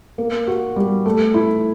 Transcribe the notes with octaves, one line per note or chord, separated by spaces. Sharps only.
A#3
F#4
G3
A3
E4